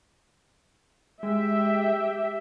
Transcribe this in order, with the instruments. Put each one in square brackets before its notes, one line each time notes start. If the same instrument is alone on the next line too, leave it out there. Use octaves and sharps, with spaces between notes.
[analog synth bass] G#3 [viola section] G4 E5 G5